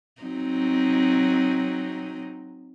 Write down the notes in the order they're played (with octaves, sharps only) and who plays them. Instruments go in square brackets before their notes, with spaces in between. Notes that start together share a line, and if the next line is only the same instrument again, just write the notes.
[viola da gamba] F#3 C4 D#4